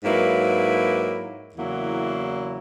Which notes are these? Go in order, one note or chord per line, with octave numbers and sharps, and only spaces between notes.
G#2 F#3 A#3 E4 B4
E2 C#3 F#3 A#3 E4